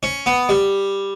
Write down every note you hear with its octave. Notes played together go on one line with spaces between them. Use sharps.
C#4
B3
G3